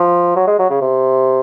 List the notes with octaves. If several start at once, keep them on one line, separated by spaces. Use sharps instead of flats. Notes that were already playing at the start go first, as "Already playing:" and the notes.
Already playing: F3
F#3
G#3
F#3
C#3
C3